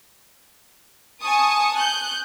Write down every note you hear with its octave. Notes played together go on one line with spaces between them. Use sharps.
G#5 A5 C#6 D#6
F#6 G6